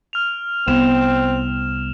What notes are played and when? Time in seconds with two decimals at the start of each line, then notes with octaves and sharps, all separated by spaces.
0.13 F6 F7
0.68 C2 B3 C4 E7